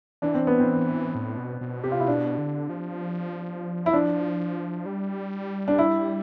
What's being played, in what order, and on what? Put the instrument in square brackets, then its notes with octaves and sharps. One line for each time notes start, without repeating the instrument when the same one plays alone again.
[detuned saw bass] E3 [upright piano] D4
[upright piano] C4
B3
C4
[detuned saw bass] A2
B2
B2
[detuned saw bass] C3 [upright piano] G4
[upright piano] F4
E4
[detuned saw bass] B2 [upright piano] D4
[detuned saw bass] D3
F3
[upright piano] E4
[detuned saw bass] F3 [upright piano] D4
[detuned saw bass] G3
[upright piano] D4
E4